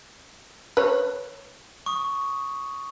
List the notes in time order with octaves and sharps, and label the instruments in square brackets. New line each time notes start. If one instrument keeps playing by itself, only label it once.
[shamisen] B4 C#5
[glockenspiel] C#6 D#6